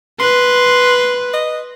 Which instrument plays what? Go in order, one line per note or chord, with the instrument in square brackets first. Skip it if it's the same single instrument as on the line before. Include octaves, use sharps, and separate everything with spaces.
[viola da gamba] B4 [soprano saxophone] C6
[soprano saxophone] D#5